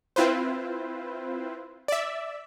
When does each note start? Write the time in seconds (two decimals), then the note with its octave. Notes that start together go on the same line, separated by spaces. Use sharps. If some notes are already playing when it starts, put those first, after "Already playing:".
0.16 C4 E4 F4 B4 C5
1.88 D5 E5